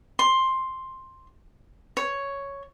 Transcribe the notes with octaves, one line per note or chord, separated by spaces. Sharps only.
C6
C#5